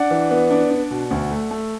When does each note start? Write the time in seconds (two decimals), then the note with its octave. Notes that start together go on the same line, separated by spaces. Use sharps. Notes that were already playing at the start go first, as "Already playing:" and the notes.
Already playing: D4 D5 F#5
0.11 E3
0.31 B3
0.51 D4
0.71 D4
0.91 B2
1.11 D2
1.31 A3
1.51 A3